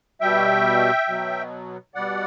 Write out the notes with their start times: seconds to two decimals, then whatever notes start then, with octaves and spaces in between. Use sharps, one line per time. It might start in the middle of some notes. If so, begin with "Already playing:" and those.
0.21 B2 G3 E5 G5
1.08 B2 F#3
1.95 B2 G3 D5 F#5